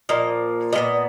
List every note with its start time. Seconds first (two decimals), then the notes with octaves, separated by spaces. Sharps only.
0.09 A#2 F3 A#3 D#5
0.73 A#2 G#3 B3 D#5